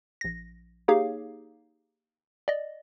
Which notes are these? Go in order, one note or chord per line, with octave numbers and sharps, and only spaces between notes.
A#1 A#6
A#3 D#4 G4 G#4 C#5 F5
D5 D#5